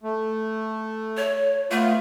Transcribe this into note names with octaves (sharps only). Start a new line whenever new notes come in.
A3
C#5
A3 B3 F4